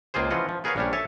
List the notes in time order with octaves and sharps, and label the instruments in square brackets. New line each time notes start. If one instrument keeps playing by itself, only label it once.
[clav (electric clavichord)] C#2 A#3 F4 G#4 C5
E3 F3 C#4 F4 D#5 F#5
F3
B3 G#4 A#4 B4 C#5 F5
A#1 G3 C#4 D4 C#5
A4 C#5 E5 G#5 A5